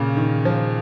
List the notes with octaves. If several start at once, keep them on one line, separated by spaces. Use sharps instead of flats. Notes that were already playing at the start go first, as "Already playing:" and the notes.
Already playing: A#2 C#3
D#3
F3